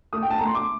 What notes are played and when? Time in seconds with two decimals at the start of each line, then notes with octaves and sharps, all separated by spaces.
0.13 A3 D#6
0.23 G5
0.30 A5
0.38 A3 A#5
0.47 C6
0.55 D6